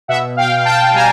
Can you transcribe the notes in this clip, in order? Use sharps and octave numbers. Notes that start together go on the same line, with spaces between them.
B2 E5 F#5
F5 G5
B2
G5 A5
G3 G#5 A#5